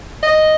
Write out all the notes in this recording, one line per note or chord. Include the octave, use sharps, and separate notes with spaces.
D#5